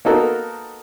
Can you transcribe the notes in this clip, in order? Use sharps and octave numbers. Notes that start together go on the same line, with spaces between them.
A#3 B3 D#4 F#4 A4 A#4